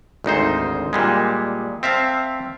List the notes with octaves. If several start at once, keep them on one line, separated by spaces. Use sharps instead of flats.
G#1 D2 D#4 C5
A#2 G3 G#3
C4 E5 F5 A5